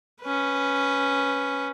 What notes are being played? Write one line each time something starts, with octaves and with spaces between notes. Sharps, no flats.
C#4 B4